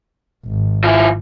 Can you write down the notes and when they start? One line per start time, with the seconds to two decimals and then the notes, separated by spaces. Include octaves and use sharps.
0.46 G#1
0.84 F3 E4